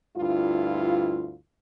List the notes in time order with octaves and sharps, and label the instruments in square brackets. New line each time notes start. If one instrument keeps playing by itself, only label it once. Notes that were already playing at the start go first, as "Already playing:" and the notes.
[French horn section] D2 G2 E4 F4